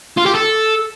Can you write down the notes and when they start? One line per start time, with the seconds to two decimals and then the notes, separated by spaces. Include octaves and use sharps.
0.18 F4
0.26 G4
0.35 A4